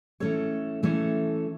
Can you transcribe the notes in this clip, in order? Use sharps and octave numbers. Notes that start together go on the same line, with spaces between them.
E3 A3 C#4 A4 C#5
E3 A3 C#4 A4 C#5